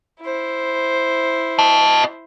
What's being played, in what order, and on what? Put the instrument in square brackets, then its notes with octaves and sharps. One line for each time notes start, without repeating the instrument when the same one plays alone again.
[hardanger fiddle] E4 C5
[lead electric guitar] D#5 A5